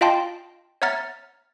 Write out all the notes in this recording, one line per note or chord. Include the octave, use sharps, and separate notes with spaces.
F4 D#5 F5 G5 A5 C6
C#5 E5 F#5 A#5 F6 A6